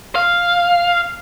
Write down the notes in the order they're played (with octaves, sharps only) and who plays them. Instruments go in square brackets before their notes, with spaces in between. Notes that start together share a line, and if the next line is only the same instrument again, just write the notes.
[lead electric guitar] F5